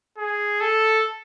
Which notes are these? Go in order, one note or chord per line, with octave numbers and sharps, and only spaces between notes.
G#4
A4